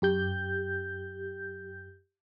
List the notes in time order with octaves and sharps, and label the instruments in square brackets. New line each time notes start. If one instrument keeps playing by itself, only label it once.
[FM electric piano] F#2 G4 G6